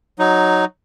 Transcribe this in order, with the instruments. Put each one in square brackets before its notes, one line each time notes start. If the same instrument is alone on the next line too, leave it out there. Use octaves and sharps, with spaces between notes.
[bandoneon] F#3 D#4